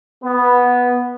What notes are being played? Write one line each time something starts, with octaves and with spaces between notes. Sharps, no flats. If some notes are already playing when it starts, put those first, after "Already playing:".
B3